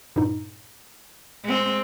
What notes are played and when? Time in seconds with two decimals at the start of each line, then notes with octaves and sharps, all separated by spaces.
0.16 G2 A#2 D#4
1.44 G#3 C4